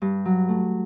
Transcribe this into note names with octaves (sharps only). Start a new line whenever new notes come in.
G2
F#3
A3